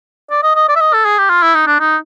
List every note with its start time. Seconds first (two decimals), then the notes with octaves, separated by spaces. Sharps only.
0.31 D5
0.43 D#5
0.56 D#5
0.69 D5
0.76 E5
0.81 D#5
0.93 A4
1.05 G#4
1.18 G4
1.30 F4
1.42 E4
1.55 D#4
1.67 D4
1.80 D#4